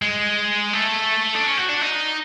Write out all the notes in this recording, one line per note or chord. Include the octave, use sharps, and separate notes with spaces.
G#3
A3
D4
C#4
F#4
D4
D#4